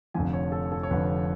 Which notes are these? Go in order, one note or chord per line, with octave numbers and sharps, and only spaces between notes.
F1 F2 D3 F3 G#5
C#5
A4
A4
C#5
F1 F2 D3 F3 B4